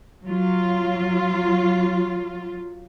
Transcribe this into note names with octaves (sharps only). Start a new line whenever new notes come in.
F#3 F4